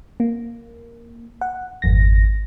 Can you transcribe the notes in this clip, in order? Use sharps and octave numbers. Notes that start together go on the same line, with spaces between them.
A#3
F#5
G#1 F2 A#6